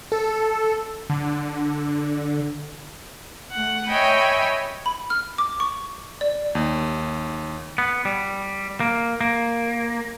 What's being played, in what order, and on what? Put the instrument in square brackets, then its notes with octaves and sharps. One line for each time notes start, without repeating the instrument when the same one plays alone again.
[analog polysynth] A4
D3
[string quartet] A3 F#5
C#5 D#5 E5 G5 G#5 B5
[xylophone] B5
F6
D6
C#6
D5
[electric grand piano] D#2
[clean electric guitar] B3
G3
A#3
A#3